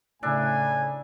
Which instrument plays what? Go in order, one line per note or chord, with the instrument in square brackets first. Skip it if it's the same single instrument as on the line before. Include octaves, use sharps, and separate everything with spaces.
[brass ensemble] A2 G#5 [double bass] C#3 [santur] D4 E5